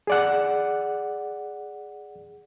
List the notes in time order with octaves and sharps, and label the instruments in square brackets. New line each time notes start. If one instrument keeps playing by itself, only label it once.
[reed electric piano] G#4 D5 F#5